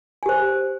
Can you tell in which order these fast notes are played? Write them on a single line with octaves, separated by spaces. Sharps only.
G#5 G4 C5